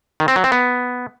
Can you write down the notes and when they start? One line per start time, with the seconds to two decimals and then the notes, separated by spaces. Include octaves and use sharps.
0.20 D#3
0.28 C4
0.36 F#3
0.44 C4
0.52 B3